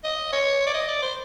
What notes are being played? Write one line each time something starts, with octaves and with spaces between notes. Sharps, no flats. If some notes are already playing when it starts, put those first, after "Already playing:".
D#5
C#5
D5
D#5
D5
C5